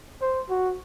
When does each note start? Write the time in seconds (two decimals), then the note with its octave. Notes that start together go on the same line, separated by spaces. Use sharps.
0.21 C5
0.50 F#4